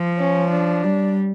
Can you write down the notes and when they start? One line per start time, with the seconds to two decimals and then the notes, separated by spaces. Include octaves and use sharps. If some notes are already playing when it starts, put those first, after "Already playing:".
Already playing: F3
0.19 C#4
0.51 D4
0.83 G3